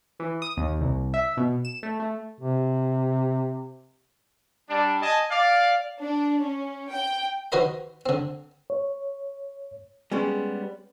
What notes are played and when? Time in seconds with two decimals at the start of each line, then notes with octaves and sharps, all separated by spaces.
0.20 E3
0.42 D#6
0.57 D#2
0.80 C2
1.14 E5
1.37 B2
1.65 E7
1.83 A3
2.00 A3
2.41 C3
4.70 G3 D4
5.02 D#5 G#5 A5
5.31 D5 F5
6.01 D4
6.43 C#4
6.90 G5
7.52 D#3 F#4 B4 C5 D#5 B5
8.06 D3 C4
8.70 C#5
10.12 G3 G#3 B3 C#4